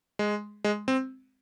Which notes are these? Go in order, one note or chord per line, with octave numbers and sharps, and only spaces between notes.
G#3
G#3
C4